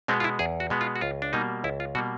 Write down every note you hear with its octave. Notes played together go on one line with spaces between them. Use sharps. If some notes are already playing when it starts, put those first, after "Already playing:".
B2 G#3 B3 C4
F4
E4
E2 G#4
F#4
B2 G#3 B3
F4
F#4
C#2 F4
D4
B2 G3 A#3 D#4
C#2 E4
F4
B2 G3 A#3 F#4